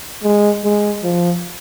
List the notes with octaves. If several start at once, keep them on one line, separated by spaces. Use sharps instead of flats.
G#3
G#3
F3